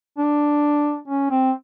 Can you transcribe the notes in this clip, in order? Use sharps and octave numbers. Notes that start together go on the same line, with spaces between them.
D4
C#4
C4